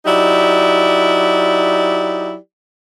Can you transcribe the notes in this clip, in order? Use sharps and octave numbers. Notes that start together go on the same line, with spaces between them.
F#3 D#4 E4 G4 D5